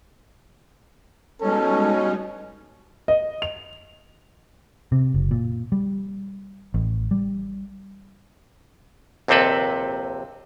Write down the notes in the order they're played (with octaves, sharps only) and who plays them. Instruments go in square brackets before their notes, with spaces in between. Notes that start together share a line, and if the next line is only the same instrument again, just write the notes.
[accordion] B2 C#4 [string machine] G3 G#3 D#4 [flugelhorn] A4
[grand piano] D#5
F7
[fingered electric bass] C3
F#1
A#2
G3
A1
G3
[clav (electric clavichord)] A#1 D#2 C3 C4 A4 B4